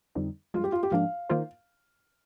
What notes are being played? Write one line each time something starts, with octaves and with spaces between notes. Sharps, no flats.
F2 D3 G3 C4 D#4
G2 F3 G#3 F4
G4
F4
G4
G#2 F3 A#3 D4 F5
D#3 A#3 F4 C5